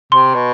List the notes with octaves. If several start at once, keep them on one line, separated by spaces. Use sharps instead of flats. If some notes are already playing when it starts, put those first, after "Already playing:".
C3 C6
B2